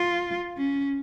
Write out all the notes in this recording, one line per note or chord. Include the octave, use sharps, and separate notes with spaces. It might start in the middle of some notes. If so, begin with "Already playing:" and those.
Already playing: F4
C#4